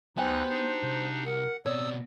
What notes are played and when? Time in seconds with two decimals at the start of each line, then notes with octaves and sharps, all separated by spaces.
0.17 D2 F#3 B3 D#4 G4 C5 G#5 F#6
0.49 D4 D#4
0.83 C2
1.26 A#4 F#5
1.66 B2 C4 C#5 D5 D#6 E6